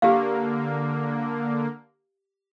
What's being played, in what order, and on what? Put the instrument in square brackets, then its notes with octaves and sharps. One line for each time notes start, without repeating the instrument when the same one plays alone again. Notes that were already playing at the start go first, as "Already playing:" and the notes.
[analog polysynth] D3 A#3 [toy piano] G4 F5